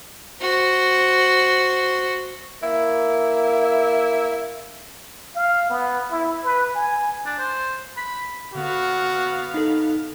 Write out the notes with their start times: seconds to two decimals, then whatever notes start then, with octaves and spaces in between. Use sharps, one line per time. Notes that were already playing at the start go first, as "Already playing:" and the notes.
0.41 F#4 C5
2.63 A#3 E4
5.36 F5
5.70 B3
6.11 E4
6.44 B4
6.75 G#5
7.26 D4
7.39 C5
7.97 B5
8.54 D3 B3 F#4 F5
9.54 D#4 A4 A#6 B6